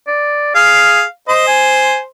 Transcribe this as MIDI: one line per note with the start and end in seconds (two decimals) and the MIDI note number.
0.07 0.54 74
0.55 1.02 68
0.55 1.04 77
1.28 2.04 72
1.28 1.46 75
1.48 1.98 80